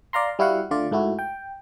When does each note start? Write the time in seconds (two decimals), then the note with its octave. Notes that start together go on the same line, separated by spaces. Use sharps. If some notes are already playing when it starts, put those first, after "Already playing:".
0.13 D5 F5 A#5 C6
0.39 G3 E4 F#4 F5 F#5
0.71 D3 A3 F4 D5
0.91 G#2 A3 E4 F#4
1.19 G5